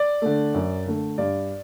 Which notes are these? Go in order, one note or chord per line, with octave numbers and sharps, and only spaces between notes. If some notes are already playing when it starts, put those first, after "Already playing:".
Already playing: D5
D3 A3
F#2
D3 A3
G2 D5